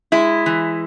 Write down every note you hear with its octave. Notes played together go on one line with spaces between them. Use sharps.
G#3 E4
E3